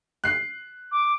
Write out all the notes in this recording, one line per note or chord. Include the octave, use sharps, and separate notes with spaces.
F#6 C7
D6